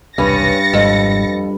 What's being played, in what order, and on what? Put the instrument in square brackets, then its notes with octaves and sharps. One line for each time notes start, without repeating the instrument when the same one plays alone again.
[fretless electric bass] E1 C2 [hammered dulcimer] G2 B4 [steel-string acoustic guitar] C#4 [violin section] A6 A#6 C#7
[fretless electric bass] G#1 G#2 G3 [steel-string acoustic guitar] F2